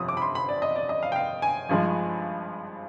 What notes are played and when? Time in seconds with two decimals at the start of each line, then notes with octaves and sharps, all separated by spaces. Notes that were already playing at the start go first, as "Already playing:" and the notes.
Already playing: G1 F2 C3 F3 D#6
0.09 D6
0.17 B5
0.22 C6
0.35 B5
0.49 D5
0.62 D#5
0.76 D5
0.89 D#5
1.03 F5
1.12 G5
1.16 F5
1.42 G#5
1.69 G#1 G2 F3 G#3